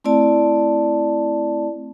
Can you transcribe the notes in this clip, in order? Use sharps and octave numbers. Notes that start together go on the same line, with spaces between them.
A3 C4 E4 D5 A5